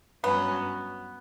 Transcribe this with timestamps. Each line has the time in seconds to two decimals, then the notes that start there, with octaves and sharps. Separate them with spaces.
0.24 G2 F#3 B3 C#4